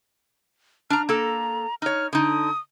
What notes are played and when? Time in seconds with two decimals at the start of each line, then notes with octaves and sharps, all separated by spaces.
0.90 D4 A#5 F6
1.09 A#3 A4 A#5
1.82 D#4 C#5 F6
2.13 D3 D#4 D#6